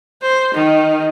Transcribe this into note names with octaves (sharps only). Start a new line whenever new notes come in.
C5
D#3